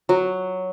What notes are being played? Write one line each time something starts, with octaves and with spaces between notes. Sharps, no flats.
F#3